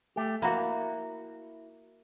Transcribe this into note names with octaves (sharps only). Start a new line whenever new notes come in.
A3 G4
A#3 E4 F#4